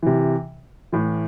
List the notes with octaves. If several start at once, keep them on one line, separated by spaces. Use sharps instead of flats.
C3 E3
A2 E3